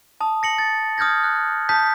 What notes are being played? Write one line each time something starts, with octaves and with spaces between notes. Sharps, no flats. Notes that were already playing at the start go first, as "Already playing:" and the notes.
A5 D#6
A#6 C#7 F#7
A6
D#6 F6 G6 G#6 A#6
F#6
A5 D#6 G6 B6